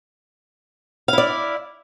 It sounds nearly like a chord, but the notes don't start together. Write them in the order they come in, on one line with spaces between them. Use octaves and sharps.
F5 E4 D5